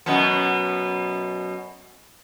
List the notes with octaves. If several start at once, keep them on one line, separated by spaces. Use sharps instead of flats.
F#2 B2 B3